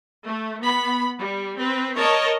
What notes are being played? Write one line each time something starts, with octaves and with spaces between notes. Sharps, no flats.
A3
B3 B5
G3
C4 B4
A#4 C#5 D#5 A5